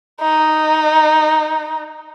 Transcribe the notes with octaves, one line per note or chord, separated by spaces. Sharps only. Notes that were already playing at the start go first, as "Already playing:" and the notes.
D#4